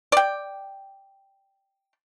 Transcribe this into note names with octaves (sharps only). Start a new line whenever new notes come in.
D5 G5